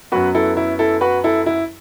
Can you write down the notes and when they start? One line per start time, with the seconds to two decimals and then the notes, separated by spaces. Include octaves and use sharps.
0.12 F#2 F#3 B3 F#4 B4
0.35 E4 A4
0.57 E4
0.79 E4 A4
1.01 F#4 B4
1.24 E4 A4
1.46 E4